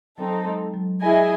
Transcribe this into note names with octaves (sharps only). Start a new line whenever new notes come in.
F#3 C4 D#4 A4
G#3
F#3
E4 G#4 D#5 G#5